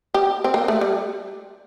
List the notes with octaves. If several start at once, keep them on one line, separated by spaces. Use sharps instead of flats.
G4
C4
A#3
A3
G3